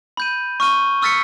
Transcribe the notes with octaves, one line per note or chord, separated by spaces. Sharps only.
B5 G6 D#7
C#6 F6 D#7 G7
C#6 E6 F6 A6 B6 C#7